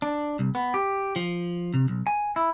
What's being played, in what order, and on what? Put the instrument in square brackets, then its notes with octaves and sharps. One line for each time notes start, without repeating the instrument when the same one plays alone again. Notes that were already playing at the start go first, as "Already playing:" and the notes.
[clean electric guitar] D4
C2
B3
G4
F3
C3
B1
G#5
E4